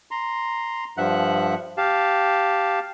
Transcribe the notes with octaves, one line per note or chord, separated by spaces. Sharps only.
A#5 C6
G2 F3 E5 F#5 F#6
G4 F5 A5